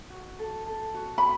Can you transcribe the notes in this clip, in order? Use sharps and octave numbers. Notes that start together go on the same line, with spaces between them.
F#4
A4
A4
F#4
B5